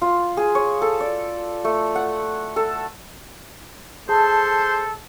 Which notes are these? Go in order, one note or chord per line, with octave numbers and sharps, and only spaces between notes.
F4
G#4
C#5
A4
D5
A3
F#5
A4
G#4 A4 C5 A5